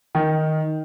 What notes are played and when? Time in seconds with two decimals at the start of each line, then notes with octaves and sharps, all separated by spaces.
0.15 D#3